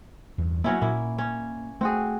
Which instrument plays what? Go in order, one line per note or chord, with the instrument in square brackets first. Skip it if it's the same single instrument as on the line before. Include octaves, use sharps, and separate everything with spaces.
[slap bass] E2 G2
[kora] F#3 C#4 E4 [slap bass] A#3 B3
[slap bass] A#2 [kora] A#3 E4
[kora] C#4
[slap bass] A3 [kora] C4 F#4 G#4